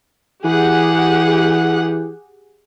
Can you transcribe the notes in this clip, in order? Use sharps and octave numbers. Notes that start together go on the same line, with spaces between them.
E3 G4 G#4 F#5